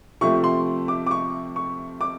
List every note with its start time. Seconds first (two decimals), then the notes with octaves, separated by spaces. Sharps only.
0.21 C3 F3 A3 C#6
0.44 C6
0.88 D6
1.07 D6
1.11 C#6
1.56 C#6
2.01 D6